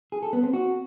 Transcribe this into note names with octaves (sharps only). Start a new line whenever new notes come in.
G#4
A4
B3
C4
F#4